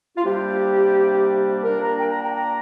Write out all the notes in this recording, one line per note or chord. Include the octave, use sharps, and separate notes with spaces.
F4
C3 G3 A#3 D4 G4
A#2 A#3 D4 A#4
A#5
G5
A#5
G5
A#5